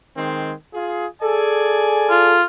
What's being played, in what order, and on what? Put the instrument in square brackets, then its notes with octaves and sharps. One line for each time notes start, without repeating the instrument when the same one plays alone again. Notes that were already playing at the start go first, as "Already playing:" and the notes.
[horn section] D#3 G#3 C4
F4 G#4
[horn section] G#4 D5 G#5 [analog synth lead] A4
[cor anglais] F4